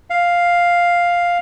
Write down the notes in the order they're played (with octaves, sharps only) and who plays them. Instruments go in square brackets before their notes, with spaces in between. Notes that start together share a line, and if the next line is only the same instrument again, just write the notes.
[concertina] F5